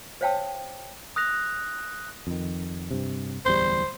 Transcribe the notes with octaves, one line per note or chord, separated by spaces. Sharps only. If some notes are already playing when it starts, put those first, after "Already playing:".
C5 C#5 F5 G5 A5 E6
D#6 F#6 A#6 F7
F2 D#3
G2 C3
D1 E2 G3 C5